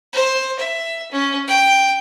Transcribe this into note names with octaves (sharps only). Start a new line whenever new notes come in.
C5
E5
C#4
G5